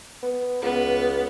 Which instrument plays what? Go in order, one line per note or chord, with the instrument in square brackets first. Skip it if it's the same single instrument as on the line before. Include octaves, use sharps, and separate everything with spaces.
[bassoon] B3
[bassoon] C#2 [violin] B3